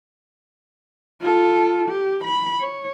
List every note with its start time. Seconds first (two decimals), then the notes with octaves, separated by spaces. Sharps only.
1.21 F4 A4
1.89 G4
2.24 B5
2.60 C#5